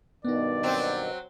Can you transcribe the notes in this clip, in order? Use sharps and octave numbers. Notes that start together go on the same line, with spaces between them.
G2 B2 D#3 B3 D#4 D5
F#3 C4